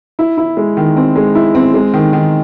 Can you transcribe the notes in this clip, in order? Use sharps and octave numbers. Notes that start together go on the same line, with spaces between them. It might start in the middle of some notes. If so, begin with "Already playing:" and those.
E4
E4
G#3
D#3
C4
G#3
E4
C4
G#3
D#3
D#3